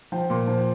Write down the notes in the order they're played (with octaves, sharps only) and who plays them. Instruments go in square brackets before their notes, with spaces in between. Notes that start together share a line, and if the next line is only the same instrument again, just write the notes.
[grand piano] F3 G5
A#2
F3